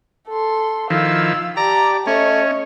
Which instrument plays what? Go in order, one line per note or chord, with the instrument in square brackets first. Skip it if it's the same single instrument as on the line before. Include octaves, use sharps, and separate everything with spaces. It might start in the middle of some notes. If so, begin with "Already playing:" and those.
[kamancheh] A4 C6
[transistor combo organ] D#3 F3 E4 [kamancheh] F5 E6
[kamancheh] G4 A5 [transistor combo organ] D5 [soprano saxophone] A#5
[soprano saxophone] A3 [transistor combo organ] C#4 [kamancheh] C#5 D#5